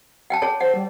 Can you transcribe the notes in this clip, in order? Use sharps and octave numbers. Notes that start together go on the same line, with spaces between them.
F#5 G5 A5
G#4 C#5 A5
C5 F#5
G3